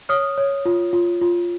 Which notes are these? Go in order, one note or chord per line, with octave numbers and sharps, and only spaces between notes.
C#5 D#6 F6
C#5
F4
F4
F4